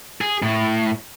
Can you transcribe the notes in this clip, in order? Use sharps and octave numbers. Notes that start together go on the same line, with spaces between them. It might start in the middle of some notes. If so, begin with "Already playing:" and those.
G#4
A2